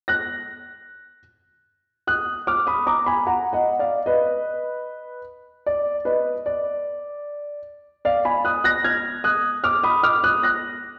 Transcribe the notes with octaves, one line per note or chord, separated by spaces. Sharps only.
F#6 A#6
D#6 F#6
D6 F6
B5 D#6
A#5 D6
G#5 B5
F#5 A#5
D#5 F#5
D5 F5
B4 D#5
D5
B4 D#5
D5
D5 F5
G#5 B5
D#6 F#6
F#6 A#6
F6 G#6
D#6 F#6
D6 F6
B5 D#6
D6 F6
D#6 F#6
F#6 A#6